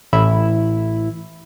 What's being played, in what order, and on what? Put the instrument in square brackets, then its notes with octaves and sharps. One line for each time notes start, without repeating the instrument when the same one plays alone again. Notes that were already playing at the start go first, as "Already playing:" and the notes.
[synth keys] A1 E4